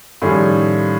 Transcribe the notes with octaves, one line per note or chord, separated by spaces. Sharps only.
A2 D#3 F3 G3 C#4 G#4